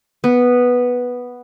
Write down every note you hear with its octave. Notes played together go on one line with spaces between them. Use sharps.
B3